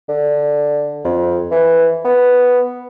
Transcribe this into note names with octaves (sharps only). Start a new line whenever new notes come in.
D3
F2
E3
B3